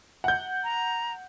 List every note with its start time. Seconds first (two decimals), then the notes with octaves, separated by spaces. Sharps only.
0.24 F#5 G6
0.64 A#5